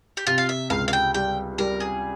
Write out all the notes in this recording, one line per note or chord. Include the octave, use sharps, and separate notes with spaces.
G4
C3 F4
F5
E5
C#2 F5
F5
G5
G3 G5
G3 A#4
G#4